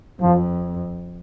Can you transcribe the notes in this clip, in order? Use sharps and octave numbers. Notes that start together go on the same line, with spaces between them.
F2 F3